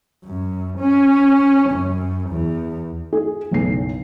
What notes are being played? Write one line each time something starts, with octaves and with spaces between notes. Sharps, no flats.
F#2
C#4
F#2
E2
G#4
F#1 B1 B3 C7